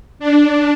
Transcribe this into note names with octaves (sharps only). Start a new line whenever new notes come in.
D4